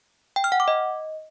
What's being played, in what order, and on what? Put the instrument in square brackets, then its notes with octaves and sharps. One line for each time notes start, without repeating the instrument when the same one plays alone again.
[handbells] G5
F6
F#5
D6
D#5